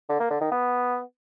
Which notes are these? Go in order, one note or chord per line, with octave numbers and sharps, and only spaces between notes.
D3
A#3
D3
D#3
B3